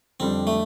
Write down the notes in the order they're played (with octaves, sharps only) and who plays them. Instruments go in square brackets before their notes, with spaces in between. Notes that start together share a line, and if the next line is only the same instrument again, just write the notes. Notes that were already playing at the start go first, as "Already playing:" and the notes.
[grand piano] F2 D3 G3 D4 [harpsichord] C4
[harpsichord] A3